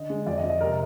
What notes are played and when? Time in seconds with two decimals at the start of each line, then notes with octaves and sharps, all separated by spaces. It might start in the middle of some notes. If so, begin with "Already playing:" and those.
Already playing: D3 D#5
0.10 G#3
0.27 F2 D5
0.38 D#5
0.44 F2
0.50 D#5
0.61 C3 A#4